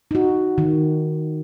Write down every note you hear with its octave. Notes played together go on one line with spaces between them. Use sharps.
D#4 F#4
D#3